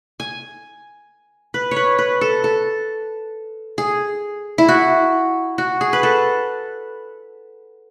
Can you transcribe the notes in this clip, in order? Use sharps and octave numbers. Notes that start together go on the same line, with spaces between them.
G#5
B4
C#5
B4
B4
A4
A4
G#4
E4
F#4
F#4
G#4
B4
A4